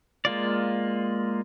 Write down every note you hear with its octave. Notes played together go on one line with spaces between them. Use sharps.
G#3 A#3 F4 D5